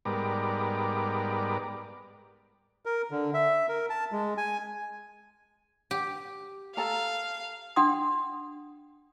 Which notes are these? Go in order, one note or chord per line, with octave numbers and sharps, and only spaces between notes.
G#2 G3 B3 A#4 D5
A#4
D3
E5
A#4
A5
G#3
G#5
G4
A4 F5 A5 A#5
D4 F#5 G5 C6 D#6